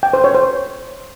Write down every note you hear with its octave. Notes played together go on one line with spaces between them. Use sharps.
G5
C5
C#5
C5